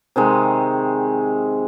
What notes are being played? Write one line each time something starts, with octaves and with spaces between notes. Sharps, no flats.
C3 D#3 G#3